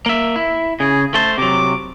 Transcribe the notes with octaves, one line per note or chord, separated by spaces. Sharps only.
A#3 E5
E4
C#3 G#4
A3 C5 A5
C3 F#3 D6